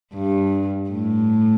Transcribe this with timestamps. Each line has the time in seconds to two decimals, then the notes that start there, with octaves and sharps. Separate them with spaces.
0.14 G2
0.90 A2